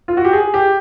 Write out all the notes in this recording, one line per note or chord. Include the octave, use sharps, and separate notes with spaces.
F4
F#4
G4
G#4
G4